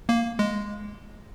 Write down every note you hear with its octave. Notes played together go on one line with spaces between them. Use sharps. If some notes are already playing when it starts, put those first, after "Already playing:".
A#3
G#3